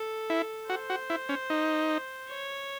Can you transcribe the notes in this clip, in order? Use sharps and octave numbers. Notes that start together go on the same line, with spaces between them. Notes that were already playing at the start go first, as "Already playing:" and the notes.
Already playing: A4
E4
F#4 C5
F#4
E4
C#4
D#4
C#5